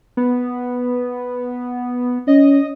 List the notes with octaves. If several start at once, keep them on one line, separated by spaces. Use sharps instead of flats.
B3
C#4 D#5